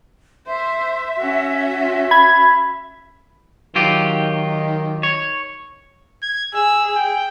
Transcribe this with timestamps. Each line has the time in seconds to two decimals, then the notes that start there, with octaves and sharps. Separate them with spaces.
0.47 C5 E5
1.18 C#4 F#4
2.11 B5 G#6
3.75 D#3 F#3 F4 G4
5.03 C#5
6.22 G#6
6.54 G#4 E6
6.95 G5